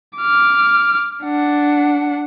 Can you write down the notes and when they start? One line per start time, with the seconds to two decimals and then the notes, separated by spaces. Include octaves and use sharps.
0.18 D6 F6
1.24 D4 F#5